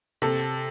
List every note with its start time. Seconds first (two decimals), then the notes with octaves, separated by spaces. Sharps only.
0.22 C3 A4